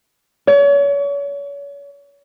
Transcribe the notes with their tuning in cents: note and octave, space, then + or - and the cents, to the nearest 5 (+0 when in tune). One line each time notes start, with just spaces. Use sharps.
C#5 +35